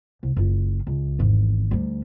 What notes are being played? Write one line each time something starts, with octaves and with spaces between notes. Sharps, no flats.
C2
F#1 F4
C#2
G#1 E2
D2 G3